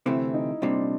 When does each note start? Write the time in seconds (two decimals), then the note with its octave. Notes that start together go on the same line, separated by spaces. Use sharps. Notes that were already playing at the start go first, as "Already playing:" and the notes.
0.06 D2 C3 E3 A3 C4 E4
0.34 D#4
0.62 C2 A#2 G3 C4 D4